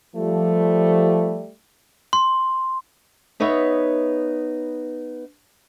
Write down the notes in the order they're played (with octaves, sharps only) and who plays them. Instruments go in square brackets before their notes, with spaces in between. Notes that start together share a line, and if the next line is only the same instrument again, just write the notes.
[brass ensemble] F3 [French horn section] G3 A3
[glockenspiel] C6
[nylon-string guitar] B3 D#4 B4 C#5 E5